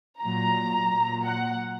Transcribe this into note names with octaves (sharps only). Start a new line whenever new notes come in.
A#2 F#3 A#5
A#2 F#3
F#5